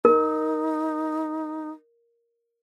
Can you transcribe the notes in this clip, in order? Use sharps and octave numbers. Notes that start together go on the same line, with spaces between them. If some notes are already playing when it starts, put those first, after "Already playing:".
D#4 A#4